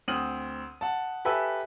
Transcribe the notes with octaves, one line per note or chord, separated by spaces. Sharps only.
D2 C4 D#6 F6 D#7 F#7
F#5 A5
G4 A4 B4 E5 G#5 E6